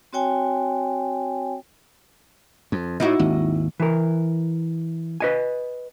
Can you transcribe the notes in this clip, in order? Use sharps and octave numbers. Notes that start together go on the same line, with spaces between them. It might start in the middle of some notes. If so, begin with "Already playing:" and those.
C4 F#4 C#5 G5 G#5
F2
A2 D#4 E4 F#4
G#1 D#2
E3 A#4
B4 D#5 G#5